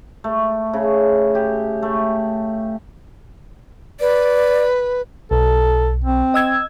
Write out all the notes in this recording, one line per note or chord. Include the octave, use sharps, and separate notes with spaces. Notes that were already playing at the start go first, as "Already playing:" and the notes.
A3
C#3
G4
A3
B4 D5
B1 A4
C4
D#5 E6 G#6